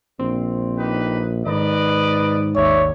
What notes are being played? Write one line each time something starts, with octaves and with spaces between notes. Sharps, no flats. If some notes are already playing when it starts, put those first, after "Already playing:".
A#1 C4
D#4 G4 B4
G#2 D#3 B4 D5 D#5
G#1 D#2 D#3 C#5 D5 E5